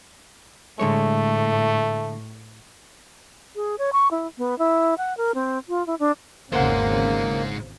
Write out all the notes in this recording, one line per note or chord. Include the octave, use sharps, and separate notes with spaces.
A2 D3 G#3 A3 C#5
G#4
C#5
C#6
E4
B3
E4
F#5
A#4
C4
F4
E4
D4
G#1 E2 G#2 C#3 G#3 A#3 C5 F#5